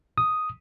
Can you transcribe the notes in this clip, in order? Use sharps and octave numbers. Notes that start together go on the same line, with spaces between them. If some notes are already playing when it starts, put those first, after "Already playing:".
D#6